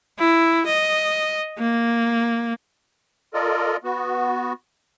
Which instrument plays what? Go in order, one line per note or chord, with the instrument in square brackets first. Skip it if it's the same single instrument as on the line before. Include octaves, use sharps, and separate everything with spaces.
[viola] E4
D#5
A#3
[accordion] F4 A4 A#4 D5 D#5
B3 F#4